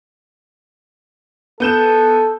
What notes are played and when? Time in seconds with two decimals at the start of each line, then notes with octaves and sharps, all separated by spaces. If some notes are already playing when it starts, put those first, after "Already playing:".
1.60 B3 A4 G6 E7